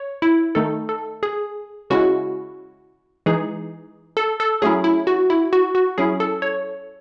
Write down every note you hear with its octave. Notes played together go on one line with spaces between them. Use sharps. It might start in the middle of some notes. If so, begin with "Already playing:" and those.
Already playing: C#5
E4
D#3 A3 D#4 A4
A4
G#4
C#3 G#3 C#4 E4 F#4
E3 G#3 D#4 G#4
A4
A4
F#3 A3 C#4 E4 G#4
E4
F#4
E4
F#4
F#4
F#3 C#4 E4 G#4
A4
C#5